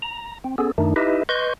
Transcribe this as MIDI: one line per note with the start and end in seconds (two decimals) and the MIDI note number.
0.02 0.38 82
0.44 0.56 60
0.58 0.72 59
0.58 0.72 61
0.58 0.72 68
0.58 0.72 69
0.78 0.94 42
0.78 0.94 51
0.78 0.94 57
0.78 0.94 62
0.78 0.94 63
0.96 1.23 63
0.96 1.23 64
0.96 1.23 67
0.96 1.23 71
0.96 1.23 75
0.96 1.23 76
1.29 1.53 71
1.29 1.53 75
1.29 1.53 84
1.29 1.53 85
1.29 1.53 91